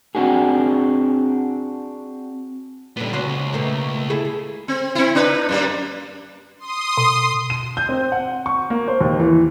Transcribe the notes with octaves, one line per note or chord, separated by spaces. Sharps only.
C4 D4 F#4 G#4
A#2 D3 G3 B3
C#2 C#4 F#4 C5
B2 A3 A#3
E4 G#4 A4
G#4
C4
C4 E4
D4 D#4 B4
F#2 G3 A#3
C6 D#6
B2
D#7
G6
C4
F#5
C#6
A#3
C5
D#2
E3